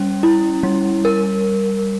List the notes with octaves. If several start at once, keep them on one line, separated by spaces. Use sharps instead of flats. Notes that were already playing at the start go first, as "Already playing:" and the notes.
Already playing: G3 C#4
E4
G3
A#4